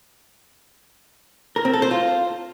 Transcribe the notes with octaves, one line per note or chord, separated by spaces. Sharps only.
A#4
C4
A4
C5
F4